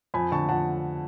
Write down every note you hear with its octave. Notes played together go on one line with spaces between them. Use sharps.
F2 G#5 B5
D3 A5 C#6
F2 F#5 A5